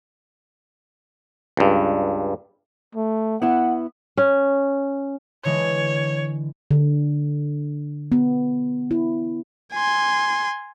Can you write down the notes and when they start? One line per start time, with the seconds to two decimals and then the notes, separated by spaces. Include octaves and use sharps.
1.57 C#2 G2
2.95 A3
3.42 B3 E4 F#5
4.17 C#4
5.45 D3 E3 G#3 C#5
6.71 D3
8.12 B3
8.91 E4
9.73 G#5 C6